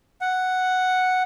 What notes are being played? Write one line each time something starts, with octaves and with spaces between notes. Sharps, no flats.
F#5